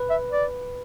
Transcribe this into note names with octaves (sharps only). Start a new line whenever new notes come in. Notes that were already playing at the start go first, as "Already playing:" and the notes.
Already playing: B4
E5
D5